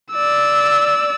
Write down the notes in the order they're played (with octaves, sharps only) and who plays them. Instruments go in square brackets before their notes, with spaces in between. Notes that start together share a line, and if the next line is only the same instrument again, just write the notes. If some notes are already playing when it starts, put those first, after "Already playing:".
[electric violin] D5 E6